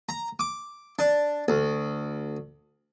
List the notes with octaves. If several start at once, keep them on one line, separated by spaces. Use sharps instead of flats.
A#5
D6
D4
D2